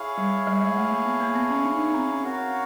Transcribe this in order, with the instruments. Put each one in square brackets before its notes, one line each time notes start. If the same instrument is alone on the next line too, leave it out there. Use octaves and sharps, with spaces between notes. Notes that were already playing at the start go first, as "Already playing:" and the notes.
Already playing: [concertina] E4 G#4 C#5 F5
[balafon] G3
G3
G#3
A3
A#3
B3
A#3
B3
C#4
D4
D#4
D4
C4
C#4
[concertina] F#4 A#4 C#5 F5